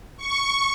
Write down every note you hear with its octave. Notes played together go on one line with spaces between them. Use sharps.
C#6